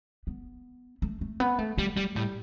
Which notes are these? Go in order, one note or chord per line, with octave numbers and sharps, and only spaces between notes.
B3
A3
A3
B3
A3
G3 A3
G3 A3
A2 G3